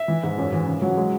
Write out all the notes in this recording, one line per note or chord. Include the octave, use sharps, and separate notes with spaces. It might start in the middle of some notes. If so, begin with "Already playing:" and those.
Already playing: E5
E3
G#2
F#2
E3
C#3
F#3
G#3